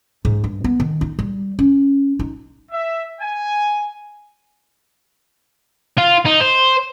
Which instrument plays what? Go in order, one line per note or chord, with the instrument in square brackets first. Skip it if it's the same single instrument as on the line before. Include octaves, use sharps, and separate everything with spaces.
[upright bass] G#2
G2
B3
D#3
D#4
G3
C#4
D#4
[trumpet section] E5
G#5
[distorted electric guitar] F4
D#4
C5